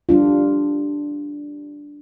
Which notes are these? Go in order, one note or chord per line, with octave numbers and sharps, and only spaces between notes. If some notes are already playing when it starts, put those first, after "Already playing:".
G3 D4 F4